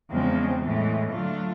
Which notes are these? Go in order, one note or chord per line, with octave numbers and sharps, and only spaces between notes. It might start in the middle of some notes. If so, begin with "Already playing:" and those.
E2 C#3 F3 G#3 C4
A2 E3 G#3
D3 F#3 A3 D4 F4